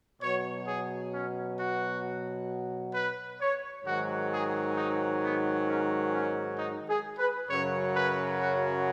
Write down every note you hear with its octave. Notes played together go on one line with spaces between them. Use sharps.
B2 F#3 C#5
G#4
C#4
F#4
B4
C#5
G#2 D#3 F#3 F#4
G#4
D#4
B3
C#4
C#4
D#4
G#4
B4
F#2 C#3 F#3 C#5
B4
F#4